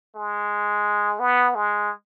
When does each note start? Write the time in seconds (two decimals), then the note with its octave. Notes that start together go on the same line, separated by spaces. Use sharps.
0.15 G#3
1.19 B3
1.55 G#3